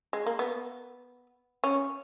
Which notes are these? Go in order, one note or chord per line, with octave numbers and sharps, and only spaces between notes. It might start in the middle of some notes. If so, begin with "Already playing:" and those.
G#3
A#3
B3
C#4